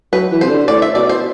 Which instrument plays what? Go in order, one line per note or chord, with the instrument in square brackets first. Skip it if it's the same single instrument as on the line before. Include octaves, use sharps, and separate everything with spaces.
[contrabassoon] F#3 [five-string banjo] B4
[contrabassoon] E3
[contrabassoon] C3 [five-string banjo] C5
[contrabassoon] D3
[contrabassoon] A2 [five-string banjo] D5
[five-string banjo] E5
[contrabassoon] B2 [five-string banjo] D5
[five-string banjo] C5